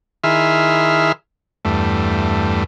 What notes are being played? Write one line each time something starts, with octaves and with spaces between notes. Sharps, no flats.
D#3 E4 G#4 E5 C6 F6
E2 G2 A3